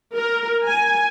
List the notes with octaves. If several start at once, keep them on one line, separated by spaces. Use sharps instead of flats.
A#4
G#5